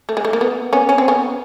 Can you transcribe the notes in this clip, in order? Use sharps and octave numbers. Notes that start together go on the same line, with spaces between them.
A3
G#3
A3
A#3
B3
B3 C#4
C#4
C4
B3 C#4